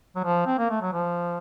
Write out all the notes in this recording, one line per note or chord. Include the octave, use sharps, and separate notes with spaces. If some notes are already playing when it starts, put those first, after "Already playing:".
F#3
F3
C4
A#3
A3
F#3
F3